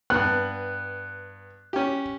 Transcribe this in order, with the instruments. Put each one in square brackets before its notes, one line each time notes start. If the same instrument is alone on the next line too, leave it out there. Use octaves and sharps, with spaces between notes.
[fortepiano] G2 B3 [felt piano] F#6
[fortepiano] C#4 G4